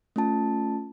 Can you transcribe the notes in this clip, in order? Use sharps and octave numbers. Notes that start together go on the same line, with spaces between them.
A3 C#4 F4 A5